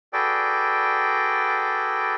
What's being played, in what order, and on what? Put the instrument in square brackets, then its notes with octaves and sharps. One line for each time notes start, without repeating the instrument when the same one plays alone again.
[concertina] F#4 G#4 A4 B4 D5 G5